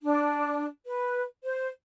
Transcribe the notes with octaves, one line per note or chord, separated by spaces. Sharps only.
D4
B4
C5